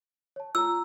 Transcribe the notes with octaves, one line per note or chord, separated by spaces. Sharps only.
C#5 A5
F4 A#5 E6